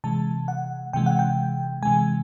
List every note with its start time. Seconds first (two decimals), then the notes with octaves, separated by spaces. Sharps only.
0.04 C3 E3 G#3 A5
0.48 F#5
0.93 C3 E3 G#3 G5
1.06 F#5
1.19 G5
1.83 C3 E3 G#3 G#5